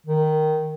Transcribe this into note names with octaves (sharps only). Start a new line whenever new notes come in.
D#3